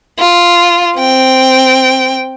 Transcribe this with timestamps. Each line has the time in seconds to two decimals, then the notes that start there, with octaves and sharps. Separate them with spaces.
0.19 F4
0.98 C4 G5